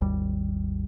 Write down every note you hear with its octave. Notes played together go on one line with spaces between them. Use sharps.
G#1 D#2 G3